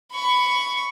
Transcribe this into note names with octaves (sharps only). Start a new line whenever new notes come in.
B5 C#6